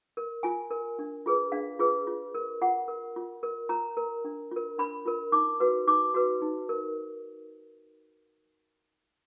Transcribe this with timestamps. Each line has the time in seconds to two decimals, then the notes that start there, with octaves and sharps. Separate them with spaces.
0.17 A#4
0.43 F4 G#5
0.71 A#4
0.99 D4
1.26 F4 G#4 B4
1.52 D4 F5
1.79 F4 G#4 B4
2.07 F4
2.35 A#4
2.61 F4 F#5
2.88 A#4
3.16 F4
3.43 A#4
3.69 F4 A#5
3.97 A#4
4.25 D4
4.51 F4
4.56 A#4
4.79 D4 B5
5.06 F4 A#4
5.32 D#4 D6
5.60 F#4 B4
5.88 D#4 D6
6.14 F#4 B4
6.42 D#4
6.69 A#4